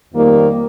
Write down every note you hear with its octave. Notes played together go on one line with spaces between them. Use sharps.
F2 D#3 G3 A#3